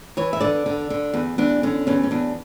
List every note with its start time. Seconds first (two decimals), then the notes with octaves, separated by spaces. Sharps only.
0.17 E3 C#5
0.33 E5
0.41 D3 D5
0.66 D3
0.90 D3
1.13 E2
1.38 E2 D4
1.63 D3 C#4
1.87 E2 C#4
2.03 C#4
2.11 E2 D4